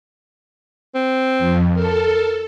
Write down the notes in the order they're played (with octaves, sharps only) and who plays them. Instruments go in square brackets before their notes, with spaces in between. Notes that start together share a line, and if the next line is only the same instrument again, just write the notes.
[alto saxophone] C4
[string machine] F2
[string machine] A4 [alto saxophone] A#4